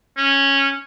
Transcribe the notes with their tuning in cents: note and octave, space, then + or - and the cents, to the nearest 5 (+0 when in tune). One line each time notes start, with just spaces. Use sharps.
C#4 -10